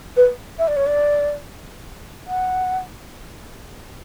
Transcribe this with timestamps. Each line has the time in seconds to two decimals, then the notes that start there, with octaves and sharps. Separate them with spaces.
0.17 B4
0.59 E5
0.68 D5
0.76 C#5
0.87 D5
2.27 F#5